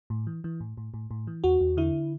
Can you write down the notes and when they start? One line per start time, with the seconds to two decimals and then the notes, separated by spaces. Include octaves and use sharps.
0.10 A2
0.27 E3
0.44 E3
0.60 A2
0.77 A2
0.94 A2
1.11 A2
1.27 E3
1.44 E2 F#4
1.61 E2
1.77 D3 E4